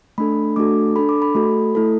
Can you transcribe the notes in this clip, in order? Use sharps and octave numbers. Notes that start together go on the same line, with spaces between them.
A3 D4 A4 B5
A3 D4 F#4 A4 D6
D4 A4 B5
D6
B5
A3 F#4 A4
A3 E4 A4